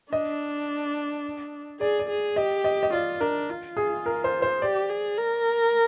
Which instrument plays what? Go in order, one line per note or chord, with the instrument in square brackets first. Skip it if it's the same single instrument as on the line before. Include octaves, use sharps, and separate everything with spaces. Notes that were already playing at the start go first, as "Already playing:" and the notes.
[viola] D4 [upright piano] D#5
[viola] G#4 [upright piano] D5
[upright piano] D5
[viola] G#4
[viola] G4 [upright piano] D#5
[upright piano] D#5
D#5
[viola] F4 [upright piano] D5
[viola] D4 [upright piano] A#4
[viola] F4
[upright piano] G#4
A#4
C5
C5
[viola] G4 [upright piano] D5
[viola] G#4
A#4